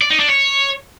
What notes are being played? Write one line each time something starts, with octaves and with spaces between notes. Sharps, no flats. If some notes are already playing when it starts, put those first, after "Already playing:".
D5
D#4
D4
C#5